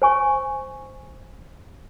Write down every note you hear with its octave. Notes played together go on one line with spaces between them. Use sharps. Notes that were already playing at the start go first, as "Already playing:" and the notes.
C5 G#5 C#6